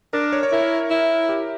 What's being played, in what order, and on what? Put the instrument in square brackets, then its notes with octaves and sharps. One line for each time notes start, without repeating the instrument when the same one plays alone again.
[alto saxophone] D4 [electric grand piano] A#4
[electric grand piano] C#5
C#5
[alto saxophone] E4 [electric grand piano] A#4
[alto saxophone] E4
[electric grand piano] G4